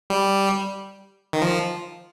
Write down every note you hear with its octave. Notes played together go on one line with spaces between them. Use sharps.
G3
D#3
F3